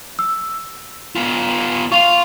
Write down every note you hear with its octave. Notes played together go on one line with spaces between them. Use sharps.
E6
B3 F4
F4 F5 C#6 F7